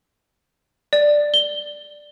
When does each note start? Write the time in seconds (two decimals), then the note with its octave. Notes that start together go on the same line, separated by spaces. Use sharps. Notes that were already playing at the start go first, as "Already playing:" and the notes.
0.93 D5
1.34 G7